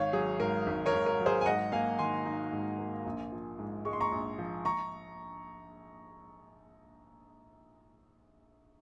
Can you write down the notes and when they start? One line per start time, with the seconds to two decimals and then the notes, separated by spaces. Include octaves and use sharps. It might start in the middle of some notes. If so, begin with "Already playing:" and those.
Already playing: G#1 C#5 F5
0.13 F#3 G#4
0.40 G#2 A#4
0.66 G#1
0.86 A#4 C#5
0.93 G#1
1.06 A#4
1.20 F#3
1.26 G#4 C5
1.41 G#5
1.46 G#2 D#5 F#5
1.72 A#3 F5 G#5
1.99 D#3 G#5 C6
2.26 D#4
2.52 G#2
2.79 A#3
3.05 A#1
3.32 F3
3.59 G#2
3.85 G#3 C#6
3.93 C6
4.00 A#5 C#6
4.12 A#1
4.38 F3
4.65 A#5 C#6